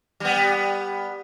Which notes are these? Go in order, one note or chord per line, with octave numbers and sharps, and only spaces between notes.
G3 B3